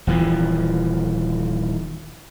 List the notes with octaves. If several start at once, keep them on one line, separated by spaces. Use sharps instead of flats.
D#1 E3 F3